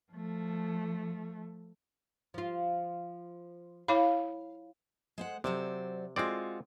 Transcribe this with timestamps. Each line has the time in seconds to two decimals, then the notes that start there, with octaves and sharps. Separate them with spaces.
0.12 F3 A3
2.34 F3 F4
3.88 E4 C#5 F5 B5
5.18 G#3 C5 F#5
5.44 C3 F#3 C5 D5
6.16 G#3 C4 F4 F#4 D5